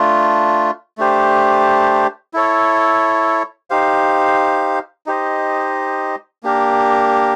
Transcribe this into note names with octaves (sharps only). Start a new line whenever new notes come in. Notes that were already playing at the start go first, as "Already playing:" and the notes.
Already playing: A3 D4 F4
A3 D4 G4 C5
E4 A4 C#5
D#4 G4 C5 F5
D#4 G4 C5 D#5
A#3 D4 G4 A#4